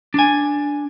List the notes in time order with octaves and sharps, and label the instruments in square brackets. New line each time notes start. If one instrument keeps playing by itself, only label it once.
[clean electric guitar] D4 G#5